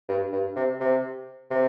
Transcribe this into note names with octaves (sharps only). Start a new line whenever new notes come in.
G2
G2
C3
C3
C3